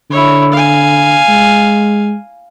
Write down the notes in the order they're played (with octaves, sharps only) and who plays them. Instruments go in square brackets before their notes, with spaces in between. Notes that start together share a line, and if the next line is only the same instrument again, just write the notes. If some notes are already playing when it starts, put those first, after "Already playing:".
[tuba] D3 [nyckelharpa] E4 C#5
[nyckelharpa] F5 G#5
[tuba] G#3